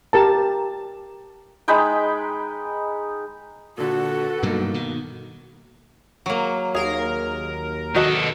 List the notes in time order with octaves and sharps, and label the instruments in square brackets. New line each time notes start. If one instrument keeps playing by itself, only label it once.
[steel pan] G4 A#4 A5
[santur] G#3 D#4 B4 G5
[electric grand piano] A#2 D3 [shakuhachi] F#4 [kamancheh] A4 B4
[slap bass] G2 B2 F#3 [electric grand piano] A#3 D#4
[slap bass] B2 D#3
[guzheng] F#3 A#3
[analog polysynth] D#2 A#4 A#5 [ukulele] G#4 F5
[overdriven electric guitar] D#3 A4 [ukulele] F#4 B4 D#5